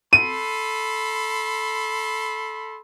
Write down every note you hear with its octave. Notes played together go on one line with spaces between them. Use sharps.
A4 B5 C6 D#7